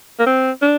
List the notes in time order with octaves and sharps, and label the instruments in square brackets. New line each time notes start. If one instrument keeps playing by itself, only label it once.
[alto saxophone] A#3
C4
D4